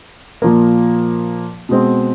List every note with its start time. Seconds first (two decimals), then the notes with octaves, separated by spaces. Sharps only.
0.42 A#2 F3 A#3
1.69 B2 G#3 C4